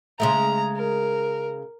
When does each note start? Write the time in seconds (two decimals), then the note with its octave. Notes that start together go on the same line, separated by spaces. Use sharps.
0.20 C#3 G#3 A3 A#5
0.77 A#4